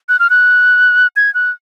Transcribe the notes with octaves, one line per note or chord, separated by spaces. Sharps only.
F#6
F6
F#6
G#6
F#6